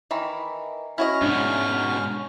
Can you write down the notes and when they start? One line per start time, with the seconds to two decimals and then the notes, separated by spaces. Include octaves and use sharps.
0.11 D#3 E3 B5
0.98 C#4 E4 F#4 D#5 F6
1.22 G#2 B2 D4